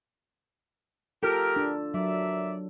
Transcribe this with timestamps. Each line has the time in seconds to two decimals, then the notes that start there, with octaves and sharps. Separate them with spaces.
1.23 F4 G4 A4 A#4
1.56 D4
1.94 F#3 A#4 D5 E5